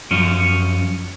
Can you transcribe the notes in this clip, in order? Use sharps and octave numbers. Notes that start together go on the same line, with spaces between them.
F#2 F3 C#4